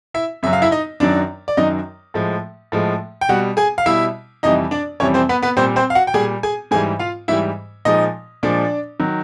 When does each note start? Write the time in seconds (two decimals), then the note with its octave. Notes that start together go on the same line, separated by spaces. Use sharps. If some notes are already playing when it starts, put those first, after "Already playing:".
0.14 E4 E5
0.43 F#2 C#3 F#3 E5
0.53 F5
0.62 E4 E5
0.71 D#4 D#5
1.00 F#2 D#3 F#3 D4 D5
1.48 D5
1.57 F#2 D#3 F#3 D#4 D#5
2.14 A2 F3 G#3
2.72 A2 F3 G#3
3.21 G5
3.29 B2 G3 F#4 F#5
3.57 G#4 G#5
3.78 F5
3.86 B2 G3 E4 E5
4.43 F2 C3 E3 G3 D#4 D#5
4.71 D4 D5
5.00 F2 C3 E3 G3 C#4 C#5
5.14 C4 C5
5.29 B3 B4
5.42 B3 B4
5.57 A#2 G3 C4 C5
5.76 C4 C5
5.90 F5
5.95 F#4 F#5
6.07 G5
6.14 A#2 G3 G#4 G#5
6.43 G#4 G#5
6.71 G#2 E3 G3 G#4 G#5
6.99 F4 F5
7.28 G#2 E3 G3 E4 E5
7.85 A#2 F3 G#3 D#4 D#5
8.43 A#2 F3 G#3 D4 D5
9.00 D#3 F#3